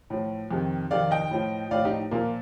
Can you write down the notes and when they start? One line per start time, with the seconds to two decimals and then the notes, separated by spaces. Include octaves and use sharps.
0.10 A2 F3
0.51 F2 C3 D#3
0.91 F2 C3 D#3 D5 F5
1.11 D#5 G5
1.31 A2 F3
1.71 A2 F3 D5 F5
1.85 D#4 G4
2.11 A#2 F3 A#3